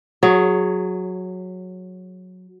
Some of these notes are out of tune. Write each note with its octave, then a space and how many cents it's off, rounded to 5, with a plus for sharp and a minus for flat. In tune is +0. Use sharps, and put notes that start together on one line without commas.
F#3 -10 G#4 +0 C#5 +20